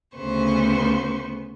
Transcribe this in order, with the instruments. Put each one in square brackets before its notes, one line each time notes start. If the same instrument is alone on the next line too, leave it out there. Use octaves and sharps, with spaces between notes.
[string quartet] D2 C#3 B3 B4 C5 C#6